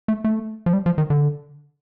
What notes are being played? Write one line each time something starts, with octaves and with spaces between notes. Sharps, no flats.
A3
A3
F3
G3
F3
D#3
D3